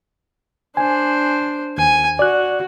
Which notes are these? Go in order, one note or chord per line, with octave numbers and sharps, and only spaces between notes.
D4 C5 G#5
D#2 G#5
F#4 D5 F#6